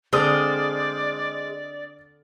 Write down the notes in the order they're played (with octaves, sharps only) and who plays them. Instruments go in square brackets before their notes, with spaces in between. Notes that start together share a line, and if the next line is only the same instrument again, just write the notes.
[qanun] D3 C4 D4 [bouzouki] G#3 C5 [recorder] D5 [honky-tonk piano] D#6 F6